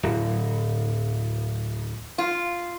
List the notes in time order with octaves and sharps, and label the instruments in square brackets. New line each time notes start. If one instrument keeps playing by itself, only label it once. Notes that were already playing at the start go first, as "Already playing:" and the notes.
[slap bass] D1
[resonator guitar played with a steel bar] F4